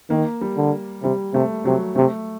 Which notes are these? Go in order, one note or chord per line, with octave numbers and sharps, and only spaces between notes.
D#3 A#3
G3
D3
C3 G3
C3 A3
C3 F#3
C3 A3